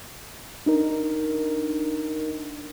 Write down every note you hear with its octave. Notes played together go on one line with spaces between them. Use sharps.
D4 D#4 A#4